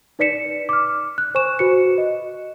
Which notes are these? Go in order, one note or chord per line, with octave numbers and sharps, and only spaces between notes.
D#4 B4 D5 B6 C#7 E7
D6 F6
F#6
C5 G#5 C#6 E7
F#4 B4 C#7
D#5